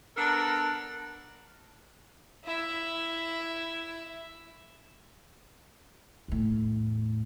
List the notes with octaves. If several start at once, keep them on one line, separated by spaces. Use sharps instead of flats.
B3 D4 A4 A#4
E4 E5
E2 A2